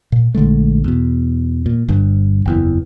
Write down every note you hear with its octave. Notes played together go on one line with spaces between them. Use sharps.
A#2
A#1 D3 G#3 A3
E2 B2
A#2
G1 G2
F#1 E2 E3